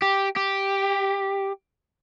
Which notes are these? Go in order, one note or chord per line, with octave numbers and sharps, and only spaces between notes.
G4
G4